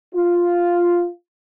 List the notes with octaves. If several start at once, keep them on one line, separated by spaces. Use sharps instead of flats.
F4